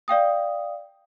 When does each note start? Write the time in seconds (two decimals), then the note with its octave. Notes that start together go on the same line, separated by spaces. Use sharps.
0.08 D5 F5 G5 D#6